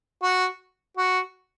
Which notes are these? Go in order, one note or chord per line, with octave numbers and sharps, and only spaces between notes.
F#4
F#4